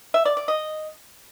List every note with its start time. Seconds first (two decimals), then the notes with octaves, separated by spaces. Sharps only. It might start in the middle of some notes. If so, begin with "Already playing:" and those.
0.14 E5
0.25 D5
0.37 D5
0.48 D#5